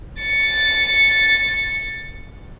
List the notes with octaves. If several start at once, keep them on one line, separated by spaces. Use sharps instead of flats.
A6 C#7